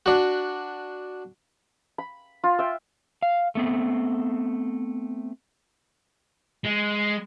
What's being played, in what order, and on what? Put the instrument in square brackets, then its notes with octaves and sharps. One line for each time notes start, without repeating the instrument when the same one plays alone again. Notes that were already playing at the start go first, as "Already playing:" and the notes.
[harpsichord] D4 F#4
[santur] B5
F4
E5 G5
[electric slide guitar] F5
A3 B3 C4
[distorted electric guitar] G#3